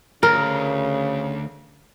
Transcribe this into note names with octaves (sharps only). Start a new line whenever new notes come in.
D2 C#3 A#4